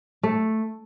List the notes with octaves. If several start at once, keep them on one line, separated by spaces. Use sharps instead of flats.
A3